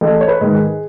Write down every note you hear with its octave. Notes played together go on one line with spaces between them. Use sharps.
A1 A4
C#5
B4
G#2 D#3
G#4